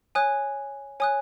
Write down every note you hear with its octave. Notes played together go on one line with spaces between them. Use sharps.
C#5 G#5 D#6 F#6
C#5 G#5 D#6 F#6